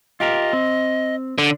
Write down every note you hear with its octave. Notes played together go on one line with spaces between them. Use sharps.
F4 G4 A#4 D#5
C4
D3